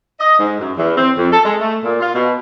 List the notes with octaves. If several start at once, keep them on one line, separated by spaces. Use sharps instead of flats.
D#5
G#2
F#2
E2
C4
F2
A4
G#3
A3
A#2
F4
B2